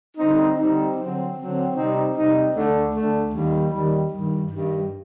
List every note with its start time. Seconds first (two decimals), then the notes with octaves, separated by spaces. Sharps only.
0.17 D3 G3 C4 D#4
0.57 D3 G3 C4 D#4
0.97 D3 F#3 C4
1.36 D3 F#3 C4
1.75 C3 G3 C4 D#4
2.15 C3 G3 C4 D#4
2.54 D2 D3 A3 D4
2.93 D2 D3 A3 D4
3.32 D#2 D#3 G3
3.71 D#2 D#3 G3
4.11 G2 D#3 G3
4.50 G2 D#3 G3